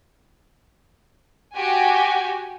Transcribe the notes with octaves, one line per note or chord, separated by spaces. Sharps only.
F#4 G4 G#5